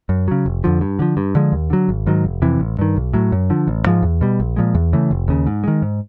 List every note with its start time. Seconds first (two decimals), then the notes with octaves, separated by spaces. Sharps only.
0.09 F#2
0.28 C#3 F#3
0.46 F1
0.64 F2 D3 F3
0.81 G2
0.99 D3 F3
1.17 G2
1.35 D3 F3 G#3
1.52 D#2
1.70 D3 F#3
1.89 G#1
2.06 G#2 D#3 F#3
2.25 F1
2.42 F2 C3 E3
2.60 A1
2.79 G2 D#3
2.96 B1
3.13 A2 F#3
3.32 F#2
3.50 D3 F3
3.68 A1
3.86 G#2 F3 G#3
4.03 E2
4.21 B2 G3
4.40 A#1
4.56 A#2 F3 G#3
4.75 E2
4.93 C#3 E3 A3
5.11 F1
5.28 D#2 C#3
5.47 G#2
5.64 D#3 G#3
5.82 G#2